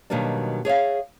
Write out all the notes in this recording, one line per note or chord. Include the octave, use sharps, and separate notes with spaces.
B2 D#3 F#3 G3 A#3 D4
G#4 C#5 E5 F5